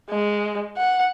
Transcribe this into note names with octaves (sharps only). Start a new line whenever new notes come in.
G#3
F#5